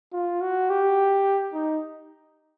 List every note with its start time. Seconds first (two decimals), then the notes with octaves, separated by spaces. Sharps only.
0.13 F4
0.41 F#4
0.70 G4
1.54 D#4